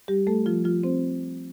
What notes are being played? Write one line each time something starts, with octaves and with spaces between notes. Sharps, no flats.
G3 G4
A3 A4
F3 F4
F3 F4
C4 C5